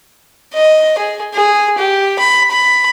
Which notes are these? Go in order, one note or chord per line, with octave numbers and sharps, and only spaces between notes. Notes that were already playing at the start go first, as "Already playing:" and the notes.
D#5
G#4
G#4
G4
B5
B5